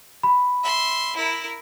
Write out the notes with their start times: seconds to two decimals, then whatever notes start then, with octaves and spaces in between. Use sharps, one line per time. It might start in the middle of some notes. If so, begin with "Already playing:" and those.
0.23 B5
0.63 E5 C6
1.17 E4 A#4